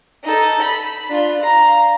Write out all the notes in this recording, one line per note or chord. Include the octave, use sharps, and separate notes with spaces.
D#4 A4
B5
D4 F4
F5 A#5